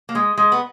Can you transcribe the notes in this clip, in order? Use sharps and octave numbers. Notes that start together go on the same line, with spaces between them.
A#3
G#3
G#3
B3